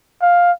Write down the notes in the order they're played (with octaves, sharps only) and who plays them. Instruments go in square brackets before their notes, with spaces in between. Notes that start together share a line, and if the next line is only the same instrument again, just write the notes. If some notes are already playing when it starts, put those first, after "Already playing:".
[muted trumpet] F5